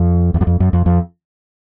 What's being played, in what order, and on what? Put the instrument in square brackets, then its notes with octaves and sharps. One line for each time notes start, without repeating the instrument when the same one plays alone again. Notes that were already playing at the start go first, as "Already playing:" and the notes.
Already playing: [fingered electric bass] F2
E2
F#2
F2
F#2
F2
F2